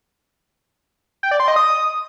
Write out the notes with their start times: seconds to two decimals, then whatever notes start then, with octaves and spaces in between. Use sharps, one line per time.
1.23 G5
1.31 D5
1.40 C6
1.48 D#5
1.56 D#6